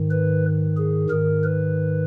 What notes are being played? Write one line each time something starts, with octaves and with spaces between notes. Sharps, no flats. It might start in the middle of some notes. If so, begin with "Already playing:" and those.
Already playing: G#2 D#3
B4
G#4
G#2 D#3 A#4
B4